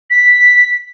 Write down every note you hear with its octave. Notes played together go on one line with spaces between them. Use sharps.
B6